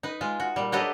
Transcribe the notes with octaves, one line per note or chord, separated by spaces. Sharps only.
D#4 B4
G#3 F4
F#4
A#2 G3
F#3 D4 G4 A4 B4 D#5